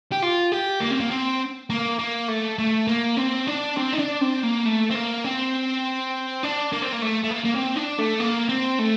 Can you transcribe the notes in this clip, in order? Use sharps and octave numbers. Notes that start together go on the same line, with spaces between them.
G4
F4
G4
A#3
C4
A#3
C4
A#3
A#3
A3
A3
A#3
C4
D4
C4
D#4
D4
C4
A#3
A3
C4
A#3
C4
D4
A#3
C4
A#3
A3
A3
A#3
A#3
C4
D4
A3
A#3
C4
A3